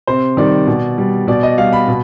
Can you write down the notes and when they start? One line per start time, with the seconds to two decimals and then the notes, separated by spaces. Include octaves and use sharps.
0.07 C3 C5
0.37 D#3 G3 D5
0.67 B2
0.98 G3
1.28 B2 D5
1.43 D#5
1.58 G3 F5
1.73 B5
1.88 B2